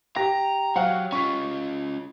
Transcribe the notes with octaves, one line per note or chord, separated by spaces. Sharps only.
G4 A#5 A#6
F#3 C5 F5 F#5
C#4 F4 C#6 B6